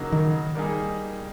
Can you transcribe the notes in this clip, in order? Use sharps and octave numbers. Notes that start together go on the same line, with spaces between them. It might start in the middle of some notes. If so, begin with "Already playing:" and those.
Already playing: C#3 F#3 A#3 D#4
D#3
G3 A#3 D#4 G#4